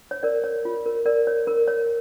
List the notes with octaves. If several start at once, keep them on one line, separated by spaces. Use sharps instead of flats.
C#5
A#4 D5
C#5
F4
A#4
A#4 D5
C#5
A#4
C#5